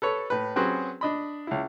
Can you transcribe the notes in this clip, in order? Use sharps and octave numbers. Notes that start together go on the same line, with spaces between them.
A4 B4 C#5
A2 B4
F#3 C4 C#4 F#4 G#4 B4
D4 D#5 B5
C#2 E4